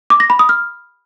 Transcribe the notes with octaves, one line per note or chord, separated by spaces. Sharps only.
D6
A#6
B5
D#6
F6